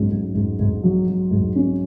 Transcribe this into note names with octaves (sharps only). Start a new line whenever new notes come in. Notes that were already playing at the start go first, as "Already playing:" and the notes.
Already playing: G#2 F#3 C#4
G#2
G#2
G#2
F#3
F#3
G#2
C#4